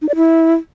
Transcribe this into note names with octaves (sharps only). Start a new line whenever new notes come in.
D#4
D5
E4